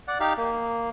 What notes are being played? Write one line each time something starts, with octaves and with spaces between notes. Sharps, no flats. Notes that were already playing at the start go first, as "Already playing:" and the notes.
D5 F#5
D#4 G4 F5
A#3